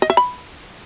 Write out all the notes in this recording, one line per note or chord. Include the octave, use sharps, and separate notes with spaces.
D#5
E5
B5